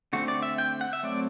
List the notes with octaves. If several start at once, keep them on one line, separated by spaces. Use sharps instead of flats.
D3 A3 C4 F#4
D5
E5
G5
F#5
E5
F#3 A3 C4 D5